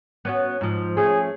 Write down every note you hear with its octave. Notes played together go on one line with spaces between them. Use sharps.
B3 C#4 F#4
G#2 F3
A3 C#4 G#4